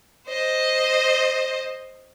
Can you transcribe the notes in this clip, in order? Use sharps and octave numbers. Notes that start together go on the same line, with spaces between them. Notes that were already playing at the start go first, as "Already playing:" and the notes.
C5 D#5